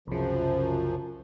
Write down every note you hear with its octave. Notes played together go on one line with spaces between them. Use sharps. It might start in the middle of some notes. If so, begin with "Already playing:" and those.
C2 F#2 C#3 F3